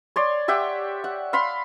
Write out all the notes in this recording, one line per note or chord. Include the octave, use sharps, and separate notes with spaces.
C#5 D5 C6
G4 E5 F#5 G5
F#5
F5 B5 C6